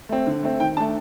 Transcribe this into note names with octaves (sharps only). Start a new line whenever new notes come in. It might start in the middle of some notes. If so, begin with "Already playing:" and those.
A3 C4
D3
A3 C4
D#3 G5
A3 D4 A5